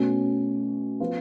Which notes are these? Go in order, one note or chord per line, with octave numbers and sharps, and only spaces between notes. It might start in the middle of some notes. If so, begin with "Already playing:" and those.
Already playing: B2 A3 C#4
F3 B3 F4